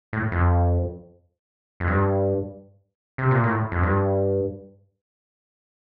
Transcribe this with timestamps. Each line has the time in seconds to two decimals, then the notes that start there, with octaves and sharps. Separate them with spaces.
0.13 A2
0.32 F2
1.80 F2
1.88 G2
3.18 C3
3.31 A#2
3.44 A2
3.72 F2
3.83 G2